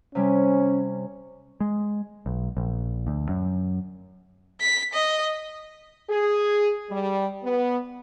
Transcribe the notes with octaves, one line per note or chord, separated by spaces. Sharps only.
C3 G3 C#4 G#5
G#3
B1
A#1
D2
F#2
B6
D#5
G#4
G3
B3